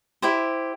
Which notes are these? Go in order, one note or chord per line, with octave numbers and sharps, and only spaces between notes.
E4 G4 C5